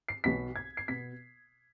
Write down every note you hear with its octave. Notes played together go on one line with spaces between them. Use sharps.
C7
B1 B2 B3 B6
G#6
C7
B2 B3 B6